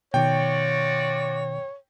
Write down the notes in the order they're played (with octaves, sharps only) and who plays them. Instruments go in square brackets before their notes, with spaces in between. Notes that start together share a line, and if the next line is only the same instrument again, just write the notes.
[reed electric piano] B2 D#3 [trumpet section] F4 F#4 D5 [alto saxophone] C#5 [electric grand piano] G5